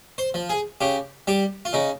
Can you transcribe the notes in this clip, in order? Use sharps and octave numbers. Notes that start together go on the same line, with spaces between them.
C5
F3
G#4
C#3 G4
G3 G4
F4
C#3 D#4